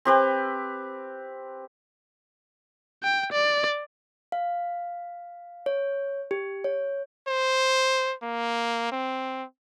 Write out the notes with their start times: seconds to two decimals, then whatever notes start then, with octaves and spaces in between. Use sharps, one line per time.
0.05 C4 G4 B4
3.03 G5
3.32 D5
4.32 F5
5.66 C#5
6.31 G4
6.64 C#5
7.28 C5
8.23 A#3
8.92 C4